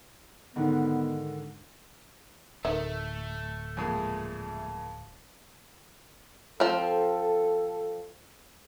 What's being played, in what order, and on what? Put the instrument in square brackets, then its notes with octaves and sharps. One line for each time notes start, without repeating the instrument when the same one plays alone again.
[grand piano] G#2 D3 D#3 [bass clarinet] B3
[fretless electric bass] D1 [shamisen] D#3 E5 [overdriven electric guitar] A3
[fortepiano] F2 A#2 G#3
[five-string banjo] F3 C4 [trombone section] A4